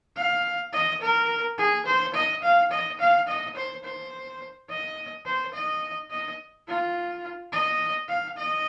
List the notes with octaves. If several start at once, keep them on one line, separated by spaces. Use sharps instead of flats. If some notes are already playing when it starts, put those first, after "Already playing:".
F5
D#5
A#4
G#4
C5
D#5
F5
D#5
F5
D#5
C5
C5
D#5
C5
D#5
D#5
F4
D#5
F5
D#5